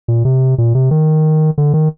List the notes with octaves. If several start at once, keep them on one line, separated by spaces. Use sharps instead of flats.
A#2
C3
A#2
C3
D#3
D3
D#3